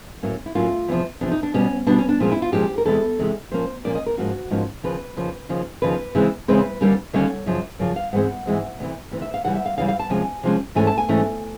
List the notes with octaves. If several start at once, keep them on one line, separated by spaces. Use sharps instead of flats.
A2 F#3 A#3 C#4
E4
A2 F#3 A#3 C#4 F4
E2 C3 F3
E2 C3 F3 D4
D#4
D4
B2 G3 B3 C#4
B2 G3 B3 D4
C#4
D4
A#2 F3 G#3 C#4
E4
F4
A#2 F3 G#3 C#4 G4
A#4
E2 C3 E3 G#3 A4
E2 C3 E3 G#3
A#2 F3 A#3 C#4 C5
A#2 F3 A#3 C#4 D5
D#5
A#4
G#2 F3 A#3 C#4 F#4
G#2 F3 A#3 C#4
D#2 C#3 F3 B4
D#2 C#3 F3
D#2 C#3 F3
D#2 C#3 F3 B4
C#3 E3 G#3 C4
C#3 E3 G#3 C4 B4
D#2 D3 G3 A#3 C#4
D#2 D3 G3 A#3 C#4 C#5
F#2 C#3 F3
F#2 C#3 F3 D5
F5
G#2 E3 G#3 C4 F#5
G#2 E3 G#3 C4
D2 C3 E3
D2 C3 E3
E5
F5
C#3 E3 G3 F#5
E5
F5
C#3 E3 G3 F5
F5
A5
C3 F3 G#3 C#4 G#5
C3 F3 G#3 C#4
G#2 E3 A3 C#4 G#5
A5
G#5
G#2 E3 A3 C#4